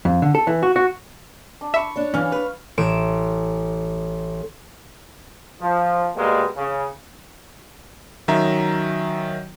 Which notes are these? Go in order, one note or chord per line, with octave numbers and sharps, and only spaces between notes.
F2
D3
A4
E3
F#4
F#4
D4
E5 B5 C#6
D4 C#5
E3 C#4 F5
B4
A1 D7 E7
F3
B2 G3 G#3 A#3
C#3
D#3 F#3 C#4 E5 A#5